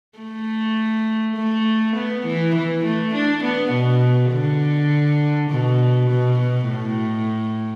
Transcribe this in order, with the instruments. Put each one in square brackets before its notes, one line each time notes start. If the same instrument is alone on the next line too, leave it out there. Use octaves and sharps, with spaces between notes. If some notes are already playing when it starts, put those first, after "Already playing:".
[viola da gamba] A3
A3
B3
E3
E3
A3
D4
B3
B2
D3
B2
B2
B2
A2